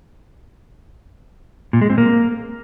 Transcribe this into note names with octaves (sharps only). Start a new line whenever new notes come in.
A#2
G#3
C4
A#3